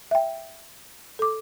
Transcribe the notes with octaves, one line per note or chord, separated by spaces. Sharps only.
E5 G5
A4 D6